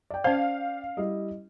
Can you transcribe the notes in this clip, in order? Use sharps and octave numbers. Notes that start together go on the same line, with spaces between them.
D5 G5
C#4 C5 F5
G3 E4 D#5